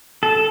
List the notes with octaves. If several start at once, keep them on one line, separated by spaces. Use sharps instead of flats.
A4